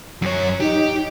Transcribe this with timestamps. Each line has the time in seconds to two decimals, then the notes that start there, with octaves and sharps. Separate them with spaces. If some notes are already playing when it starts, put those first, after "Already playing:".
0.22 F#2 C#5
0.60 D#4 G4